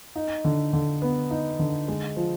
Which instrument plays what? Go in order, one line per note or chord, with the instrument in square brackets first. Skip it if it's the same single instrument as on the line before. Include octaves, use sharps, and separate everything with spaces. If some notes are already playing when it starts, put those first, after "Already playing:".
[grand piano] D#4
D3
D3
B3
D#4
D3
G#3
F3